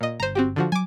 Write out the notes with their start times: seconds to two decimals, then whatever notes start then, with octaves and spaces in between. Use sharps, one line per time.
0.01 A#2 D#5
0.20 G1 C5 A#5
0.35 C4 F#4 G4
0.56 D3 F3 F#4
0.72 F#3 G#5 D6